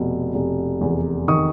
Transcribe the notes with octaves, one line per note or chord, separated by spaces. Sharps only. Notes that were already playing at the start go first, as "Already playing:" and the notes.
Already playing: F1 B2
F1
E2
D#3 C#6 D#6